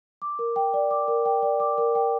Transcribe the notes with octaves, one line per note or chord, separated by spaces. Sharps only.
D6
A#4
G5
D5
D6
A#4
G5
D5
D6
A#4
G5